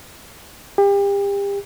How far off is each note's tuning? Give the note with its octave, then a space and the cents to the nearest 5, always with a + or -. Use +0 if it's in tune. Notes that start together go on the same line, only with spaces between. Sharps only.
G4 +35